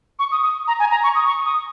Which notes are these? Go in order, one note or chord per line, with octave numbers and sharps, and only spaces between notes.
C#6
D#6
D#6
A#5
G#5
A#5
C#6
D#6
C#6
D#6